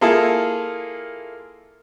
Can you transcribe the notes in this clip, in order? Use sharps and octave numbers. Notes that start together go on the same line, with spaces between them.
A#3 E4 F4 G#4 A4